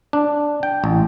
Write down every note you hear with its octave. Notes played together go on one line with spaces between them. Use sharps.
D4
G5
A1